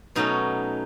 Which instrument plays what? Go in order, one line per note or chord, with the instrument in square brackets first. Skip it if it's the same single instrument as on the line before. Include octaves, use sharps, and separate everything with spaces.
[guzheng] B2 F#3 A3 C#4 D#4